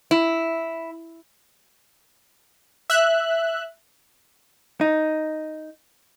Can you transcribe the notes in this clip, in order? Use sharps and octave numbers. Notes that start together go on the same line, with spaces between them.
E4
E5 F#6
D#4